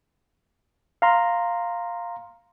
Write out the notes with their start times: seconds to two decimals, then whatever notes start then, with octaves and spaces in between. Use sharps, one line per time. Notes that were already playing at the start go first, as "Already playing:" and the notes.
1.02 F5 A#5 C6